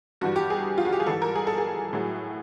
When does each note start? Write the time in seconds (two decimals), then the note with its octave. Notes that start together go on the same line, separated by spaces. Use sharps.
0.21 G2 E3 G3 F#4
0.36 G4
0.50 G#4
0.78 F4
0.85 F#4
0.93 G4
1.00 G#4
1.07 G#2 E3 G3 A4
1.22 A#4
1.35 G#4
1.47 A4
1.58 G#4
1.93 A2 F#3